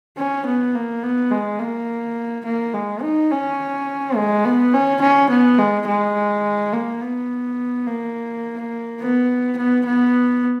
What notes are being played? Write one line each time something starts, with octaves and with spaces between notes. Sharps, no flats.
C#4
B3
A#3
B3
G#3
A#3
A#3
G#3
D#4
C#4
G#3
B3
C#4
C#4
B3
G#3
G#3
A#3
B3
A#3
B3
B3
B3